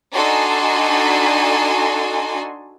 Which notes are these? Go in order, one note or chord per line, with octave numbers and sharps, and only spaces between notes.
D4 D#4 F#4 A4 G#5 C6